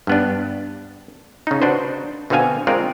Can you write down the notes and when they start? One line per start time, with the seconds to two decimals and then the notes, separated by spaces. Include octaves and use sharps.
0.07 G2 B3 D4
1.47 C#3 D#4
1.62 D4 F#4 B4 C5
2.30 B2 D3 C4 F#4 F5 G#5
2.67 G#3 C4 F4 A#4 D5